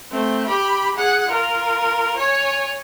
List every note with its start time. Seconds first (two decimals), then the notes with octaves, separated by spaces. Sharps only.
0.11 A3 C4
0.47 G4 B5
0.96 G#4 F#5
1.28 F4 A#4
2.16 C#5 G#5